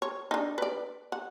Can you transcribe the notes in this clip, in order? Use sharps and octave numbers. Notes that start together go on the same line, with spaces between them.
C#5
D4 D#4
B4 D5
F#5